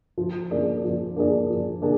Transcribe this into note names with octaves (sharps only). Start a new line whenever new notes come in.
F3
A#3 D4 G#4 D5
F3
A#3 D4 G#4 D5
F3
A#3 D4 G#4